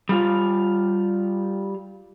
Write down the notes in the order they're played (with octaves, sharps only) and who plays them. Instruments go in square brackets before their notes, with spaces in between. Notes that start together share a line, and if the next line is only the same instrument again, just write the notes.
[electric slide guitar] G3 F4